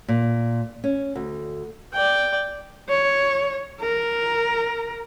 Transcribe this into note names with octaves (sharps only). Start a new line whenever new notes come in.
A#2
C#4
D2
D5 G5
C#5
A#4